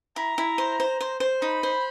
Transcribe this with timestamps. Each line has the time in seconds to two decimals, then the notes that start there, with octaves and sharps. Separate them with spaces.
0.16 E4 A#5
0.38 E4
0.58 C5
0.80 C5
1.01 C5
1.20 C5
1.42 D#4 B5
1.63 C5